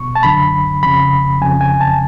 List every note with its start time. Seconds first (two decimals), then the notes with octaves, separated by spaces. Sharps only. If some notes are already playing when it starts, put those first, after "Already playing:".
Already playing: B2 C#6
0.15 A5
0.23 F#2 D3 B5
0.83 F2 C#3 B5
1.42 F2 C#3 G#5
1.61 G#5
1.81 A5